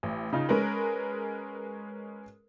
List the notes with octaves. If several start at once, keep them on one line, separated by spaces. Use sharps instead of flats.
A1
C#3 D#4 F4
G#3 C#4 A#4 B4